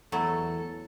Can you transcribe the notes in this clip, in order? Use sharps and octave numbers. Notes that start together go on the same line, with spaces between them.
E2 F#3 A3 E4 A4